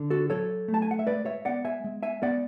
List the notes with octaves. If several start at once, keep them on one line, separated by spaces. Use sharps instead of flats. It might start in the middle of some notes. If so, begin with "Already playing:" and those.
Already playing: D3
F#4 A4
F#3 A4 C#5
A3
A5
G#5
F#5
E5
G#3 B4 D5
C#5 E5
B3 D5 F#5
E5 G#5
G#3
E5 G#5
B3 D5 F#5